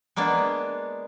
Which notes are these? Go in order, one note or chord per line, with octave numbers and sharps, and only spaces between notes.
G#3 A#3 B3 D4